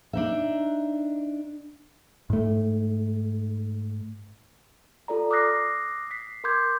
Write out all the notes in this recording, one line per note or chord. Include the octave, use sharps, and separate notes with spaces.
D4 D#4 E5
G#2 A3
F4 A4 D5 A#5
D6 D#6 F6 F#6 A#6 C7
B6 C7
A#4 C6 D6 G6 G#6